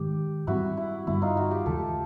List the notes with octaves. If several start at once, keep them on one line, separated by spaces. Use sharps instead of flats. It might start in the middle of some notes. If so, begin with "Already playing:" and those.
Already playing: G#2 D#3 G#3 G4
G#2 E3 G3 C4 E4 F#4
E4
G2 D3 G3 B3 E4
D#4 F4
E4 F#4
F4 G4
D#2 C#3 E3 G#3 G4 A4